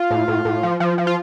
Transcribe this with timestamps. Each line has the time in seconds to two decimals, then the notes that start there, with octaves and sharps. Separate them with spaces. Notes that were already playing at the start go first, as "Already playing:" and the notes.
Already playing: F4
0.11 A2
0.28 A2
0.45 A2
0.63 F3
0.80 F3
0.98 F3
1.07 F4